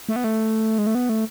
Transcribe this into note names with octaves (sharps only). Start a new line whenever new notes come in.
A3
B3
A3
G#3
A3
B3
A3